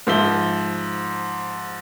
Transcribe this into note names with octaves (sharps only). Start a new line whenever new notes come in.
G#2 F3 E5 G7